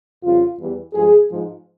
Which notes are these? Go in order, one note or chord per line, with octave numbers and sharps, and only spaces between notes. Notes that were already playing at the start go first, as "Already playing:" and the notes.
F2 C#3 G3 F4
E2 E3 G3
G2 F3 G#3 G#4
G#2 F3 G#3